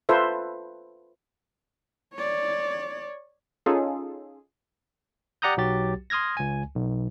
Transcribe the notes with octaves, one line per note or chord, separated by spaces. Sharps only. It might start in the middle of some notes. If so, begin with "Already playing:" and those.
F4 A4 B4 C5 E5
C#5 D5
C#4 D#4 F4 G#4 A4
G4 D5 F#5 A#5 D#6 G6
B1 F#3 F#4 G4 A6
C6 D#6 F6 G#6 A#6
C#2 G#5
B1